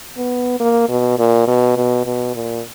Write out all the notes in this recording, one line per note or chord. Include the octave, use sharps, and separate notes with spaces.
B3
A#3
B2
A#2
B2
B2
B2
A#2